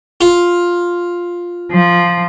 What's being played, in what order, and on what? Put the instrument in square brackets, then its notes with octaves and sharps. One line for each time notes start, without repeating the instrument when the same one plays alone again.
[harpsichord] F4
[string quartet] F3